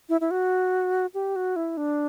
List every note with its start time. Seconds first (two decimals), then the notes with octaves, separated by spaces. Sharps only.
0.09 E4
0.21 E4
0.31 F#4
1.14 G4
1.36 F#4
1.56 E4
1.77 D4